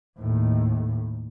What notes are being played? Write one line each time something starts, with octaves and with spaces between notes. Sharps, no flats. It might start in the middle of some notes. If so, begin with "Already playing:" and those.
D#2 A2